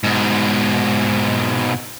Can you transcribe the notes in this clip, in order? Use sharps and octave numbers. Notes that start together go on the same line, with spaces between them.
G#2 B2